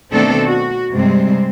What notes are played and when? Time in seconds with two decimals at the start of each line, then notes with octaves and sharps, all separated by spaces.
0.11 B2 D#3 A3 C4 D4 A4
0.46 F#4
0.92 G2 C3 G3 G#3 C4